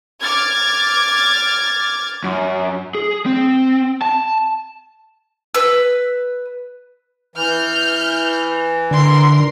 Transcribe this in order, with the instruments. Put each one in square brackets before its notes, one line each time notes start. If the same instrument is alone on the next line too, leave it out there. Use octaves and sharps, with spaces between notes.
[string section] D6 F6 G#6 A6
[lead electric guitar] F#2
G#4
C4
A5
[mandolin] B4 E6
[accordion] E3 [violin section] F6 G6
[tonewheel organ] D3 [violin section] A#4 C6